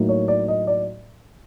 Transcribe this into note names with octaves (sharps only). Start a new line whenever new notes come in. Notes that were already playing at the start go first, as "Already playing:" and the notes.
Already playing: A2 F#3 A#3 D#4
C#5
D5
D#5
D5